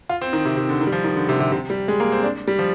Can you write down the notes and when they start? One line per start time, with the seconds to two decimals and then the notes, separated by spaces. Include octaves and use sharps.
0.09 F4
0.21 C4
0.33 D#3
0.45 C3
0.57 C3
0.69 D3
0.81 D#3
0.87 G3
0.92 F3
1.04 D#3
1.16 D3
1.29 C3
1.40 C3
1.52 C3
1.70 G3
1.88 G#3
2.00 A#3
2.12 C4
2.23 D4
2.48 G3
2.59 F3